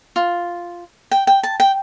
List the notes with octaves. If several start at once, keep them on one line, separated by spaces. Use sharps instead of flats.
F4
G5
G5
A5
G5